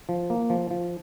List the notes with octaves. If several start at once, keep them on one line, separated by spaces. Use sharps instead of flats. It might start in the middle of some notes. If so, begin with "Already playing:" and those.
F3
A#3
F3
F3